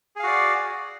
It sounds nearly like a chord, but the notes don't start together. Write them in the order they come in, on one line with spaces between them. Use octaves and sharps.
G#4 F5 F#4 D5